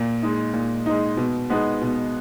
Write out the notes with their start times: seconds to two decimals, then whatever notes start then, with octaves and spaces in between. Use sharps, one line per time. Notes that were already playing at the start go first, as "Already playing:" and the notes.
Already playing: A#2
0.22 G#3 D#4
0.54 A#2
0.86 G#3 D#4
1.17 B2
1.50 G#3 B3 D#4
1.82 B2